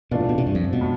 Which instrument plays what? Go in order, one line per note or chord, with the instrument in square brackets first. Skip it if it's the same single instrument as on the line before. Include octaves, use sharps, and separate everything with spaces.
[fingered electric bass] B2 [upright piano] E3 A3 D4 F4
[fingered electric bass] A2
B2
C3
G2
F2
G2
B2
[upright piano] A2